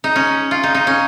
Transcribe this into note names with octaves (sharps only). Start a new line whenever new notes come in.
D#4
C#4
F4
D#4
D#4
C#4